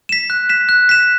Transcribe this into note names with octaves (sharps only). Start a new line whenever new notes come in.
B6 E7
F#6
B6 E7
F#6
B6 E7